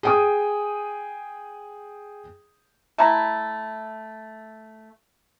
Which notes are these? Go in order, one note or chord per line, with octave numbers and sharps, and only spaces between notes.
G#4 G5 D#6
A3 E4 A#5